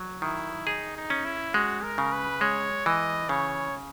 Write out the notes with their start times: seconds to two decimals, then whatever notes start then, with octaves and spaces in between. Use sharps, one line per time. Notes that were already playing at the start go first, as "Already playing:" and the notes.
Already playing: F#3
0.22 D#3 E4
0.66 D#4 G#4
0.96 D#4
1.10 C#4
1.25 E4
1.54 G#3 F#4
1.84 A#4
1.98 C#3
2.13 B4
2.41 G#3 C#5
2.86 E3 D#5
3.29 C#3 C#5